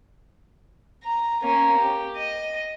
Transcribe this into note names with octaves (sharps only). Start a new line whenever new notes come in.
A#5
A#3 C#4
G4
D#5